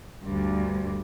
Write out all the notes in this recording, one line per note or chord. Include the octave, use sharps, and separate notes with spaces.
D2 G2